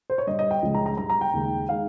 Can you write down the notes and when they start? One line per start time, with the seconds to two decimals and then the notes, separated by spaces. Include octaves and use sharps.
0.10 C5
0.18 C#5
0.27 G2 D#5
0.31 G3
0.39 D#5
0.51 G5
0.62 C#2 C#3 F3 G#3
0.75 A#5
0.86 A#5
0.98 G2 A#5
1.02 G3
1.10 A#5
1.21 G5
1.33 D#2 C#3 G#3
1.69 D#3 G#3 F5